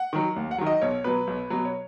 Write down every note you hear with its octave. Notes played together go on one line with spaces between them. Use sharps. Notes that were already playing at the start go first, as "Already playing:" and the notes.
Already playing: F#5
D#3 F#3
D#2
F#5
D#3 F#3
D#5
B1 C#5
B2 F#3 B4
B1
B2 F#3
C#5